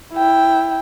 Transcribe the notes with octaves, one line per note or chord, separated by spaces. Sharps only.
E4 G5